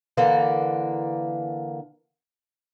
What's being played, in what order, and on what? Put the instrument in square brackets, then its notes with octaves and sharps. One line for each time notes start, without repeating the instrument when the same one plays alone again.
[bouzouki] D3 E3 A#3